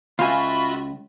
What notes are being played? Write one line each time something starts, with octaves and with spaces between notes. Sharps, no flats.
C#2 F4 F#4 E5 F5 G#5 B5